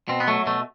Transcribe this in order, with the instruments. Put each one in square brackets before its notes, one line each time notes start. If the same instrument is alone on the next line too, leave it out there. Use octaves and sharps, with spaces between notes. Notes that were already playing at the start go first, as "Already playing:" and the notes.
[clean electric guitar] B2 C4
B3
F#3 A3
B2 A3